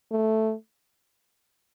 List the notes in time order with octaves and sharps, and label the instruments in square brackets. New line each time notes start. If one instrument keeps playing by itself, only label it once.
[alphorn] A3